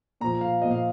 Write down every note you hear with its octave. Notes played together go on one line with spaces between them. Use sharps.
A#2 F3 A#5
F5
A#2 F3 D#5
F5